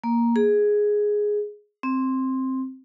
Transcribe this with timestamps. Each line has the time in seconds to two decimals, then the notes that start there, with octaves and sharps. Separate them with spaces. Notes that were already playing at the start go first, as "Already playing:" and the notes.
0.04 A#3
0.36 G#4
1.83 C4